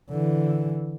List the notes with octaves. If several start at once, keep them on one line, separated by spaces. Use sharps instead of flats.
D3 E3